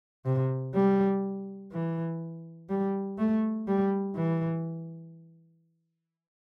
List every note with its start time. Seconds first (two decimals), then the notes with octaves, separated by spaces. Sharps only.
0.25 C3
0.74 G3
1.72 E3
2.69 G3
3.18 A3
3.68 G3
4.16 E3